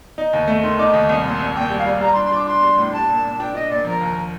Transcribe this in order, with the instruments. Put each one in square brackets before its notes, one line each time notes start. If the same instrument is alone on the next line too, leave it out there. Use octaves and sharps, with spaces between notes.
[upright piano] D#4
D#2
A3
[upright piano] D#3 [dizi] C6
[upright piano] D#4 [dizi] D6
[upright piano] D#2 [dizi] D#6
[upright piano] C2 [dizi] D#6
[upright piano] A#2 [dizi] C6
[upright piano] C2
[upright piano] A#2 [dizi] G5
[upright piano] G3
[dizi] F5
[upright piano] G3
[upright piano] G3 [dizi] A#5
[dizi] C6
[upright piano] D4
[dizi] C6
[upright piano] D4 [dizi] D6
[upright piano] D4 [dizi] C6
[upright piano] G3
A2
[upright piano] D4 [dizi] A5
[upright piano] A#2
A#2
[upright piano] D4 [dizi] G5
[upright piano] D4 [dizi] D#5
[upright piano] A#2 [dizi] D5
[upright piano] F3 [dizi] A#4
[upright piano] D#2